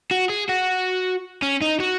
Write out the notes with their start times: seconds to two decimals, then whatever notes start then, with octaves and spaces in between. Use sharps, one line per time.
0.11 F#4
0.30 G#4
0.49 F#4
1.43 C#4
1.61 D#4
1.80 F#4